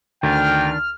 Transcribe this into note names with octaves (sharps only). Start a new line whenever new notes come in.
D2 D#3 D4 G5 F6